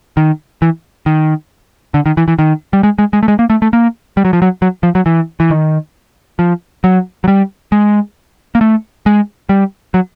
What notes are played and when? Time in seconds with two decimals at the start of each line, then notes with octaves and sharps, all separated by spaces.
0.17 D#3
0.62 E3
1.06 D#3
1.94 D3
2.06 D#3
2.17 E3
2.28 E3
2.39 D#3
2.73 G3
2.83 G#3
2.99 G#3
3.13 G#3
3.23 A3
3.28 G#3
3.39 A#3
3.50 A3
3.62 A3
3.73 A#3
4.17 G3
4.25 F#3
4.33 F3
4.42 F#3
4.62 F#3
4.83 F3
4.95 F#3
5.06 E3
5.40 E3
5.50 D#3
6.39 F3
6.84 F#3
7.24 F#3
7.28 G3
7.72 G#3
8.55 A#3
8.61 A3
9.06 G#3
9.49 G3
9.94 F#3